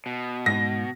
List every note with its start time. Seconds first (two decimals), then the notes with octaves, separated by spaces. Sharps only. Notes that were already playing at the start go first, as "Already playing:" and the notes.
0.06 B2
0.46 G#2 G#3 D#4 A#6